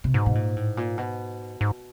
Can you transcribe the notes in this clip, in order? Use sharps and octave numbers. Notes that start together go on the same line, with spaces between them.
C3
G#2 B2
B2
A#2
A2
A#2
B2
G#2